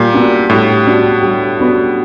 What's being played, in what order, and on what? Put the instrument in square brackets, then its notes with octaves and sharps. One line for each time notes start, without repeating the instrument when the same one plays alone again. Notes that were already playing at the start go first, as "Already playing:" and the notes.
Already playing: [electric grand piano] A#2 [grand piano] G3
[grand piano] B3 D4 F#4
[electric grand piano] A2 [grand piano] G3
[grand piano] B3 D4 F#4
G3
B3 D4 F#4